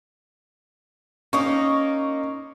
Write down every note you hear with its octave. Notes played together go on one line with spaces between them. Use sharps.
A#3 C#4 D#4 C#6